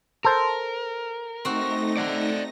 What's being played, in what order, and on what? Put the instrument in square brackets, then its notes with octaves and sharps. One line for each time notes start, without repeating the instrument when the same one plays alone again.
[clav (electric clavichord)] A4 C5 [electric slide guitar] A#4
[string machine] A3 D#4 A#6 [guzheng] C4 F#4
[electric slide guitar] D5 F#5